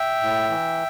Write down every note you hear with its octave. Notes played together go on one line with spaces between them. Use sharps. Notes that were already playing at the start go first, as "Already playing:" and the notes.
Already playing: E5 G5
A2
E3